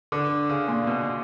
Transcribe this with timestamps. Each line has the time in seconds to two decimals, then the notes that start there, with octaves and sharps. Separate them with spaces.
0.12 D3
0.49 C#3
0.68 A#2
0.87 B2